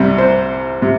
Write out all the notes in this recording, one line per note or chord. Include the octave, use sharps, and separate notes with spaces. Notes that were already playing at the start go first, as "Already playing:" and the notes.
Already playing: C2 C3 G3
C5
C3